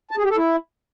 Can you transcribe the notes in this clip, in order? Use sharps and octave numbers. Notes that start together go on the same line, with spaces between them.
A5
G#4
G4
A4
E4